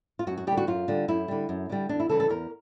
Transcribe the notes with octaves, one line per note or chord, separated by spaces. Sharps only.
F4
F#2 F#4
F#4
D3 G3 G4
F#4
F#2 F4
D3 G3
F#2 E4
D3 G3
F#2
D3 G3
E2 D4
E4
C#3 E3 G3 A4
A4
E2 A#4